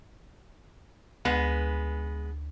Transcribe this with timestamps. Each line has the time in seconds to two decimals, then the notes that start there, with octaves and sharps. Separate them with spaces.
1.25 D2 G#3 B3 B4